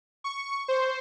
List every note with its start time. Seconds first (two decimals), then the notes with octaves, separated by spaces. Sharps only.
0.24 C#6
0.68 C5